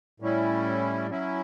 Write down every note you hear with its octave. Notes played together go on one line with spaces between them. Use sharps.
A2 G3 C#4 E4
F#3 C#4 E4